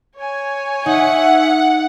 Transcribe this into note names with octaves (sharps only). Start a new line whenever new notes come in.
C#5 G#5
D#4 E5 F#5